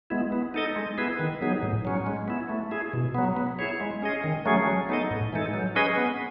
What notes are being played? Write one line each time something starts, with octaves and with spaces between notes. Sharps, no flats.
G#3 B3 E4
B3
D#4 A4 D#5
G#3
B3 E4 G#4 B4
D#3
F#3 B3 D#4 G#4
A2
F#3 C#4
G#3
B3 E4
A3
E4 G#4
B2
F#3 B3
B3
E4 G#4 C#5
G#3
C#4 G#4 D#5
D#3
F#3 A3 C#4 G#4
F#3
B3 D#4 A4 D#5
A2
E3 G#3 D#4 A4
F#3
C#4 G#4 B4 D#5
B3